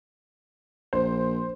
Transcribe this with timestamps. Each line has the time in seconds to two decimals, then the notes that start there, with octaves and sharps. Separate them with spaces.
0.93 A#1 C5